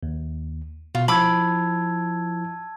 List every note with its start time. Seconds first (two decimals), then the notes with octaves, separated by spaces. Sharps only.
0.03 D#2
0.95 B2 F4
1.08 F3 E4 A5 B5 D6 E6 G#6